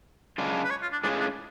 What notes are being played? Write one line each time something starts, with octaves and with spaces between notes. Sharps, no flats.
F#2 C#3 G#3 D4 F4
B4
C#5
F4
D4
A2 G#3 C#4 D4 F4 G#4
D4